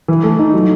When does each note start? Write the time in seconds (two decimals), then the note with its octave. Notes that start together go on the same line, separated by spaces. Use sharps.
0.08 E3
0.24 A3
0.39 D#4
0.54 F#3